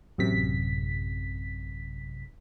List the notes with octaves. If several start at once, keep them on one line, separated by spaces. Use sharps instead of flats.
A1 F#2 C3 B6